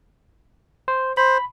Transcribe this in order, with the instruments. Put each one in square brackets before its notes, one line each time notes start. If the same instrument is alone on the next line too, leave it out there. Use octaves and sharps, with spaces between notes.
[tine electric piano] C5
[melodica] C5 [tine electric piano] B5